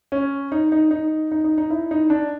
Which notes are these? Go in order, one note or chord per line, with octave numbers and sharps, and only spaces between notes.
C#4
D#4
D#4
D#4
D#4
D#4
D#4
E4
D#4
D4